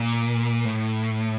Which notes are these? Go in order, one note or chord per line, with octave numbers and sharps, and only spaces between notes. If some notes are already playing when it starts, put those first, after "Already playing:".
Already playing: A#2
A2